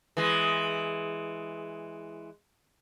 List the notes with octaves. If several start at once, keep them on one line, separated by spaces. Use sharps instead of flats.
E3 G#3